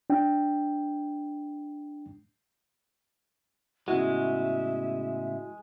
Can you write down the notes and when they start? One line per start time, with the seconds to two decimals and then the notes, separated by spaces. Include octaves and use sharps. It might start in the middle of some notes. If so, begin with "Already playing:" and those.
0.10 D4 G5
3.88 A2 C#3 G#3 B3 E4 F#4 E5